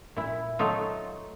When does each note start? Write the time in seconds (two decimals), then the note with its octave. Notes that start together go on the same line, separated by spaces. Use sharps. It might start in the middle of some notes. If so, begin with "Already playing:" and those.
0.16 A#2 E4
0.59 F#3 A3 D#4 F4